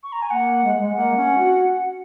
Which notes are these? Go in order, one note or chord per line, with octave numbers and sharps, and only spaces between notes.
C#6
A#5
G#5
A#3 F#5
G#3
G#3
A#3 F#5
C#4
F#4